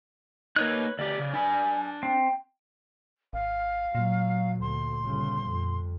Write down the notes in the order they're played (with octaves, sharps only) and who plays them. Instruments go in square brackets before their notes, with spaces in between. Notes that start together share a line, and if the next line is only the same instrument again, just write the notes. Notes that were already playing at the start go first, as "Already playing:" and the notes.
[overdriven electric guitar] A#3 D#4 [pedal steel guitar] B4 C#5 F#6
[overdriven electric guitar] D2 G4 [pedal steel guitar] D5
[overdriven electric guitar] C#3
[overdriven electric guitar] D4 B5 [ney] G#5
[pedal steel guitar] C4 [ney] G5
[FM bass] G#1 [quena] F5
[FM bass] A#2 [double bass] F#3
[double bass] D2 [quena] C6
[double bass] G1 C#3
F2